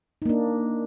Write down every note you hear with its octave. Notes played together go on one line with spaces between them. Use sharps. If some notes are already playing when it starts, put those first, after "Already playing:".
A#3 D4 D#4